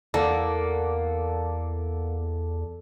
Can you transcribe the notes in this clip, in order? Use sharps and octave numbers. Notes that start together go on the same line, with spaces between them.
E2 A#3 A4 D5 F#5